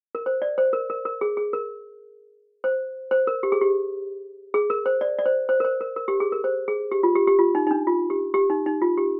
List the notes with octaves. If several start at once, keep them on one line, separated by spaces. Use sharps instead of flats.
A#4
C5
D5
C5
A#4
A#4
A#4
G#4
G#4
A#4
C5
C5
A#4
G4
G#4
G4
G#4
A#4
C5
D5
D5
C5
C5
A#4
C5
A#4
A#4
G4
G#4
A#4
C5
G#4
G4
F4
G4
G4
F4
D#4
D#4
D4
F4
G4
G4
D#4
D#4
F4
G4